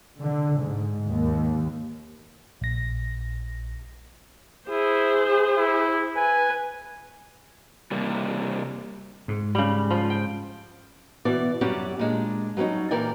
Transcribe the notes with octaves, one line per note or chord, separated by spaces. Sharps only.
D3
G#2
D#2
A#1 A#6
E4 G#4 C5
E4
B4 G#5
C3 G3 A#3
G#2
C#3 G3
F3 F4
G5
B2 E3 D5
F#2 G3 C#4 G4 D5 F#5
A#2 G#3 D4
F#3 G3 A3 C#4 D#4
A#2 E3 A#4 D5 G5 G#5